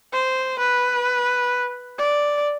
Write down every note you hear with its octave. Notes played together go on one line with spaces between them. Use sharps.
C5
B4
D5